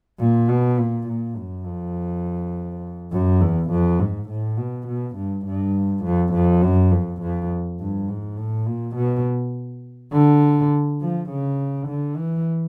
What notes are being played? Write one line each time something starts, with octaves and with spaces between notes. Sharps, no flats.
A#2
B2
A#2
A#2
F#2
F2
F#2
E2
F2
G#2
A2
B2
B2
G2
G2
F2
F2
F#2
F2
F2
G2
G#2
A2
A#2
B2
D3
F3
C#3
D3
E3